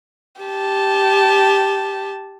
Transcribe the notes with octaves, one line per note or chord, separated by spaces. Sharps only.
G4 A5